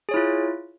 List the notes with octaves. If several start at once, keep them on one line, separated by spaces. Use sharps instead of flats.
E4 F4 G#4 C#5